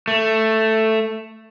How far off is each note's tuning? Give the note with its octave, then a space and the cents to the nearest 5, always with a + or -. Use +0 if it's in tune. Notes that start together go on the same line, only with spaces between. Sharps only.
A3 +5